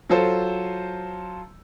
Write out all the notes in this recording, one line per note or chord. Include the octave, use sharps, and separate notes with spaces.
F#3 F4 A4 C5